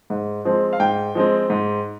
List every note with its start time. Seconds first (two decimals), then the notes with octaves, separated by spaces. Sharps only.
0.10 G#2
0.45 F3 G#3 C4
0.73 F5
0.80 G#2 G5
1.15 F3 G#3 C4
1.50 G#2